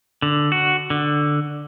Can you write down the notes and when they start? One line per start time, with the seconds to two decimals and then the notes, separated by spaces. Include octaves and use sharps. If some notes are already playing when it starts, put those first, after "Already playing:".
0.22 D3
0.52 F#4
0.90 D3